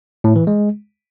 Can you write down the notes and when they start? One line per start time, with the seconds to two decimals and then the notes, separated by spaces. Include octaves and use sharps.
0.24 A2
0.36 E3
0.47 G#3